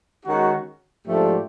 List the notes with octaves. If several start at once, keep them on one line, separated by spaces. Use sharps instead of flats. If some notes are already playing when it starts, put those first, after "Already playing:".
D#3 G#3 C#4 F#4
G#2 F3 A3 D4 G4